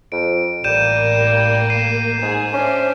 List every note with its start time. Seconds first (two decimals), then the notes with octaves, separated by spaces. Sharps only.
0.12 F2 D7
0.64 A1 G3 A#3 G6 D#7 E7
1.70 C7 D#7 E7
2.22 G#2 G#4
2.53 C#4 D4 C5 E5